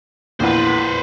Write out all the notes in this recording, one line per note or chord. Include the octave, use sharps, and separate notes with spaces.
A#1 E2 B4 C5